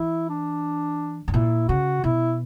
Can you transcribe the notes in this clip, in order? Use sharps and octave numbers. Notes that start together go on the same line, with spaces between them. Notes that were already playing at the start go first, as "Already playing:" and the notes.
Already playing: E3 E4
D4
G2
A#2 E4
C#3 F#4
B2 E4